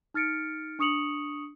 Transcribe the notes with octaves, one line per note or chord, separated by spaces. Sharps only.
D#4 F6 A6 C#7 D7
D4 C#6 D#6 C#7 F7 F#7